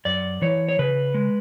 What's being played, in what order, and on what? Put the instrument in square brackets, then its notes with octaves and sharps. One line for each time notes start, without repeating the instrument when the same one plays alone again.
[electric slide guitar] F#2 D5
E3 C#5
C#5
C#3 B4
G#3